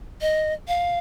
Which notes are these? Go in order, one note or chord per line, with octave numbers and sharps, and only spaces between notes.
D#5
F5